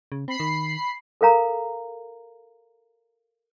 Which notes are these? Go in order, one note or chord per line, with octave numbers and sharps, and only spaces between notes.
C#3
C4 B5 C7
D#3
A4 A#4 F5 A#5